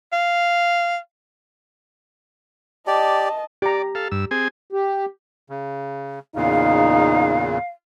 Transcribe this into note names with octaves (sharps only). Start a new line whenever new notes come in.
F5
G4 D5 D#5 A5
G4 D5 A#5
A4 F5
G2 E6
C4 G#4 G#5
G4
C#3
E2 A#2 C#3 D#4 F5